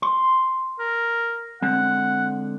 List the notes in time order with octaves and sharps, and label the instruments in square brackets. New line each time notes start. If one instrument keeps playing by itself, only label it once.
[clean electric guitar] C6
[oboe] A#4
[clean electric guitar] D3 G#3 C4 [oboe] F#5